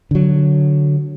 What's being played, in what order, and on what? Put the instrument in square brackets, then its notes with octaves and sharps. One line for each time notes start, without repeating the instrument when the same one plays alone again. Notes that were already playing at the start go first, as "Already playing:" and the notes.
[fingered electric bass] D3 F#3